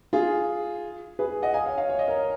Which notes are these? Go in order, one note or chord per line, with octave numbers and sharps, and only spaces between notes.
F4 G#4
G#4 B4
D#5 F#5
F5 G#5
C#5 F5
C#5 F5
C#5
D#5
A#4 C#5